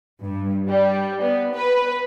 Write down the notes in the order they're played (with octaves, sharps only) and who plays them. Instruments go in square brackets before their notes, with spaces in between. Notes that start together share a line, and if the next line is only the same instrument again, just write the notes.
[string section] G2
G3
B3
B4